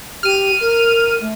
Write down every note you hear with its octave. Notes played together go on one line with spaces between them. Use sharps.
G4 F6 D#7
A#4
A3